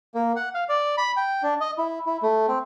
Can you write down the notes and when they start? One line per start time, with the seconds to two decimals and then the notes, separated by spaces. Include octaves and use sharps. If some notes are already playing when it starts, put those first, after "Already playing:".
0.14 A#3
0.36 F#5
0.54 F5
0.69 D5
0.97 B5
1.17 G5
1.43 D4
1.61 D#5
1.78 E4
2.06 E4
2.22 A3
2.48 C4